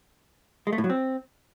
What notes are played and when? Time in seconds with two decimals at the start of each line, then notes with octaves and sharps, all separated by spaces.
0.67 G#3
0.73 A3
0.78 A2
0.84 F#3
0.90 C4